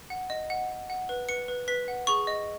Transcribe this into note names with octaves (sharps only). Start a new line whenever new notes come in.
F#5
D#5
F#5
F#5
F#5
B4
B4 C#7
B4
B4 B6
F#5
G#4 C#6
D#5